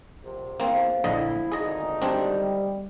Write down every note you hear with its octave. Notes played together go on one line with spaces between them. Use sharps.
A#1 C3
E2 A#3 C4 C5 F5
A#1 D3 E4 D#5
G#1 D3 D#4 G#4 D#5
G3 C4 D4